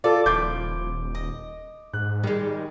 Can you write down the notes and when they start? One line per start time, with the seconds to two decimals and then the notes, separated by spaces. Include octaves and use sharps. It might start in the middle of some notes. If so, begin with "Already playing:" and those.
0.04 F4 A4 D5
0.26 D#1 F3 E4 D6 G6
1.15 D#5
1.93 G#2 F#6
2.24 D#3 G3 G#3